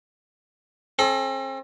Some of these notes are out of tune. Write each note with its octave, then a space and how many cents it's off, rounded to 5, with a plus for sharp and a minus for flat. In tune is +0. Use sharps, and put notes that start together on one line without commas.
C4 +40 A4 -35